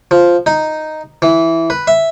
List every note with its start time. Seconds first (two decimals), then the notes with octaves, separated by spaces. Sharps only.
0.11 F3
0.46 D#4
1.22 E3
1.70 B4
1.87 E5